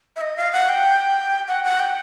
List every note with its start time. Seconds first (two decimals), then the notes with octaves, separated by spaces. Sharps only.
0.16 E5
0.21 D#5
0.37 F5
0.53 F#5
0.69 G5
1.48 F#5
1.64 F#5
1.80 G5